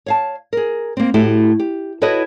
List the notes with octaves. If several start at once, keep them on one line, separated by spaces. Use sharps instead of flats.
C#5 F5 A5
G#4 A#4
A#3 C4
A2 A3 E4 F#4 G4
G4
E4 F#4 A4 B4 C#5 D#5